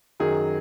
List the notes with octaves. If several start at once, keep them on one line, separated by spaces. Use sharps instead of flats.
F#2 D#3 F#3 G#4